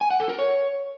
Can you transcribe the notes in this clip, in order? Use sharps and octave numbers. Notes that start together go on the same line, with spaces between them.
G#5
F#5
A4
A#4
C#5